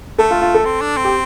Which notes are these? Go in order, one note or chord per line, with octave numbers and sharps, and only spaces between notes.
A3 A4
F4
F4
A4
C4
D4
C4
G4